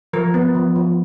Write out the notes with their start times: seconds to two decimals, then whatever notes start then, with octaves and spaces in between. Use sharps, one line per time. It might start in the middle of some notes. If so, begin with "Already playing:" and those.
0.13 F3 A#4
0.34 B3
0.54 F3
0.76 F3